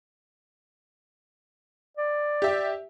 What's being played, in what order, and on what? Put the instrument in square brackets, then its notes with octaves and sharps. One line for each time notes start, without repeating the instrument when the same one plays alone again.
[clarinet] D5
[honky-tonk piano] G4 E5